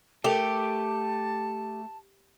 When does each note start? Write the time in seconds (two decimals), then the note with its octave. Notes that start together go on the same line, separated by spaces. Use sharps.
0.24 A3 G4 A4 A#4 A5